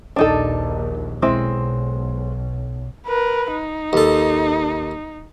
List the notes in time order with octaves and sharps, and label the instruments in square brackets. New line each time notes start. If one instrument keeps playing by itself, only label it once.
[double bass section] A#1 D#2 A#2 [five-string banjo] D4 D#4 A4
[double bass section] B1 [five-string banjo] G#3 C4 E4
[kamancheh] A#4 B4
D#4
[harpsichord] D#2 A4